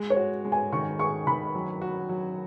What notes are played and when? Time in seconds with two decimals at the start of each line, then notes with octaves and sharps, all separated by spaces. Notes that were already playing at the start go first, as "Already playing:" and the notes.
Already playing: G#3
0.10 C#5
0.17 F#4
0.45 G#3
0.52 G#5
0.72 D#3 C#6
0.99 G#4 C#6
1.27 D#3 B5
1.55 F#3
1.81 F#4
2.09 F#3